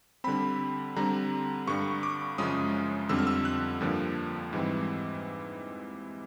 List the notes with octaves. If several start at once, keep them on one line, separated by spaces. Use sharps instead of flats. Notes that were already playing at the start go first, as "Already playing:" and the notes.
D3 G3 C4 B5
D3 G3 C4 A#5
G2 D3 G3 C#6
D6
F#2 C#3 F3 G#3 C#4 D#6
F2 D3 G3 C4 E6
F6
E6
F#6
G2 D3 F3 A#3 D4
G#2 E3 G3 C4